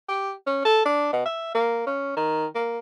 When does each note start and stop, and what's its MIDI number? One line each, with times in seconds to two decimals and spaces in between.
0.09 0.32 67
0.47 0.62 61
0.65 0.83 69
0.85 1.12 62
1.13 1.24 47
1.26 1.54 76
1.54 1.85 58
1.86 2.15 61
2.16 2.46 51
2.55 2.78 58